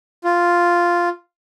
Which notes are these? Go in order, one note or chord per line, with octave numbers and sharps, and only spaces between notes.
F4